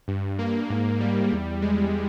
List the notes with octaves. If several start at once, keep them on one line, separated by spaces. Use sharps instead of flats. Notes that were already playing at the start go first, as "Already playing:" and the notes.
G2
A#3
G#2
G3
E2
G#3